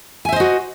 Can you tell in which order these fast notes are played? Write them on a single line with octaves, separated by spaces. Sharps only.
G#5 E5 C5 D#5 F#4